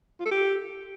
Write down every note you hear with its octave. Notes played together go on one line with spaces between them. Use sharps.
F4
A4
G4